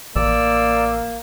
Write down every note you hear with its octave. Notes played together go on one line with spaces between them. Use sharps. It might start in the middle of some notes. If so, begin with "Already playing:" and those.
A1 A#3 D5 E6